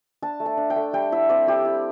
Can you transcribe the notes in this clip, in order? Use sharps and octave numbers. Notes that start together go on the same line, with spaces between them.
D4 A5
A3
A5
D4
G5
A3
G3 G5
E4 E5
C4 D5
G3 G4
E4